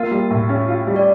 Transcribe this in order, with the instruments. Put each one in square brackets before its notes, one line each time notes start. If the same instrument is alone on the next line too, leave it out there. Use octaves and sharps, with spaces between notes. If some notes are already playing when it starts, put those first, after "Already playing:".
Already playing: [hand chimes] A#3 A#4 [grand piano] F4
[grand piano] G3
A2
C#4
F4
G3
[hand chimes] D5